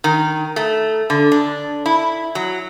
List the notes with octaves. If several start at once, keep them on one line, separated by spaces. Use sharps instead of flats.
D#3
A3
D3
D4
E4
F#3